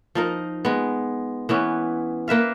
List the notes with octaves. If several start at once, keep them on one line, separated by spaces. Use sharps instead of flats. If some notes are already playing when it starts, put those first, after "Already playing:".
F3 D#4 A#4
G#3 B3
E3 B3 C#4
A#3 B4 E5 F5